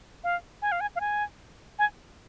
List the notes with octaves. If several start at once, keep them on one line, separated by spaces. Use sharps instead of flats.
F5
G#5
F5
G#5
F5
G#5
G#5